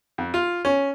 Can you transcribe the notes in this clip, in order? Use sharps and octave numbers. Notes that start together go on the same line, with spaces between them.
F2
F4
C#4